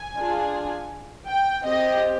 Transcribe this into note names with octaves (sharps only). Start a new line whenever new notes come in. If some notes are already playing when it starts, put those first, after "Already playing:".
Already playing: G#5
D4 F4 G#4
G5
C4 G4 D#5